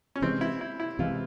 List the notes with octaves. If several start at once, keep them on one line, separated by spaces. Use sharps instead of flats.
C#4
C3 E3 G#3 C4
E4
E4
E4
C3 E3 G#3 F4